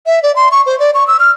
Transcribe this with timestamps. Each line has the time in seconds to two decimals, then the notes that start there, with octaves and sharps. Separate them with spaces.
0.06 E5
0.23 D5
0.36 C6
0.52 C#6
0.66 C5
0.80 D5
0.94 C#6
1.07 E6
1.20 F6